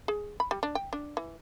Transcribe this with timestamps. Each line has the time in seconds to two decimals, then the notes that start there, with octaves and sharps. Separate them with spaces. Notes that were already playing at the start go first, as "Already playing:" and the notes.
0.08 G#4
0.40 B5
0.51 G3
0.63 D4
0.75 G5
0.93 D4
1.17 E3